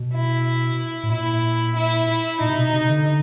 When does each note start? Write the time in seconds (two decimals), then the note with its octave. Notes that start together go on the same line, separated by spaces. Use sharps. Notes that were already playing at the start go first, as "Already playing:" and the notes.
Already playing: B2
0.14 E4
1.03 A2
1.11 A#2 E4
1.76 E4
2.40 A#2 D#4
2.49 C3
2.57 B2
2.73 C3
2.89 D3